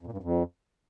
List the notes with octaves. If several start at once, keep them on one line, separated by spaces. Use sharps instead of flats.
F2
A#2
G2
F#2
F2